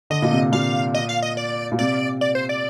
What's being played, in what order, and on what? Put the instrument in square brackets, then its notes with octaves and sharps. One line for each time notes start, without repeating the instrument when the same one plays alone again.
[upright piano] D3 [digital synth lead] D#5
[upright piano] A#2
C3
[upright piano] A#2 [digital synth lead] F5
[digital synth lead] D#5
F5
D#5
D5
[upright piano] A#2
[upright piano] C3 [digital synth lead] D5
[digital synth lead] D5
C5
D5